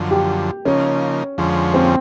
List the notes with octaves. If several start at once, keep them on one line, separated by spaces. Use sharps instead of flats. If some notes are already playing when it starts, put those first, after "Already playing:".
Already playing: F#2 D3 F3
G4
C#3 F3 A#3 C#4 D#4
F2 D3 F3 G#3 C#4
C4